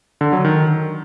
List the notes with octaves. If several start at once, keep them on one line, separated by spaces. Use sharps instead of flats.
D3
F#3
D#3